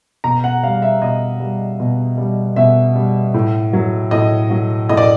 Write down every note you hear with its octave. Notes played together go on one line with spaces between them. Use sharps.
B2 A#5
F#5
G3 F5
E5
B2 D#5
G3
B2
G3
B2 E5
G3
A2
F#3
A2 D#5
F#3
A2 D#5
D5